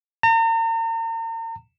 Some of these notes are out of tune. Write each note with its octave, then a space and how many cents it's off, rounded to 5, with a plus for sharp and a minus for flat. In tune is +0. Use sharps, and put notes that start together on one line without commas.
A#5 -40